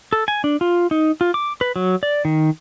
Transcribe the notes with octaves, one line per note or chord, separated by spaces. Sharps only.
A4
G#5
D4
F4
D#4
F4
D6
B4
F#3
D5
D#3